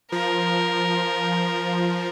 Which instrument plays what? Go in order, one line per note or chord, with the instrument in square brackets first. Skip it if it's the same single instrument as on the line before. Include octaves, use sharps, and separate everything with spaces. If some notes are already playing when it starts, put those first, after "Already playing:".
[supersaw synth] F3 [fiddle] A#4